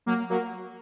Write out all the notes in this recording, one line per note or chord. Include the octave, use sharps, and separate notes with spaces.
F#3 A#3
F#3 A#3